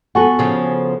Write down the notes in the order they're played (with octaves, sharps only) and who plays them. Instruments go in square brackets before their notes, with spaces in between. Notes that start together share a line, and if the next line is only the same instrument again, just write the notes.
[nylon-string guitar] B3 F#4 A4 [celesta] F#5 G#5 C#6
[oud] C#3 F3